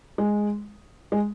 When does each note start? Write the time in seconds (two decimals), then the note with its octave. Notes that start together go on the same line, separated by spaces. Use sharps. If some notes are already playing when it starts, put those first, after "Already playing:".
0.18 G#3
1.12 G#3